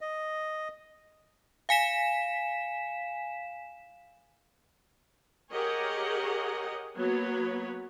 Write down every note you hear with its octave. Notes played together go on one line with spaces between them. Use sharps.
D#5
F5 G#5 B6 E7
G4 G#4 A#4 C#5 D#5 F#5
F#3 A#3 B3 B4 C#5